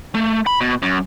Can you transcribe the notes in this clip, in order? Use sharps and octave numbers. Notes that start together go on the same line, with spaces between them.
A3
B5
B2
F#2